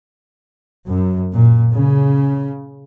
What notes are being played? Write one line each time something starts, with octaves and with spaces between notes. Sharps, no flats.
F#2
A#2
C#3